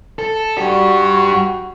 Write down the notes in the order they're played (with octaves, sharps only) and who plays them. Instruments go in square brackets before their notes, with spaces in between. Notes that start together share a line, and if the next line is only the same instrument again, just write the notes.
[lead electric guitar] A4
[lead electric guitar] G2 G4 [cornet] F#4